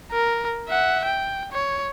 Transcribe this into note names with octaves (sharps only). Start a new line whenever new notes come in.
A#4
E5 F#5
G5
C#5